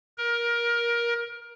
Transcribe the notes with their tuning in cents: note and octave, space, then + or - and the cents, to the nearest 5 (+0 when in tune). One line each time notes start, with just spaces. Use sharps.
A#4 +20